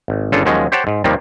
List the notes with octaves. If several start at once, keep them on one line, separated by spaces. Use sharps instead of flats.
G#1
G1 C#3 C#4 D4 F4 A4
D#2 F3 F#3 G#3 C#4
G4 C5 C#5 F#5 G5 A5
G#2
D#2 C3 D#3 F3 G3 A#3